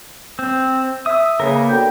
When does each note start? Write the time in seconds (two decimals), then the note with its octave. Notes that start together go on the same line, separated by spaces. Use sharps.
0.39 C4
1.06 E5 D#6
1.40 C#3 A#3 B3 A#4
1.69 D2 G5